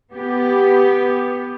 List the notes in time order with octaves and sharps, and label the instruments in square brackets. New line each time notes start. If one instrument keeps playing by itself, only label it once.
[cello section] B3 G4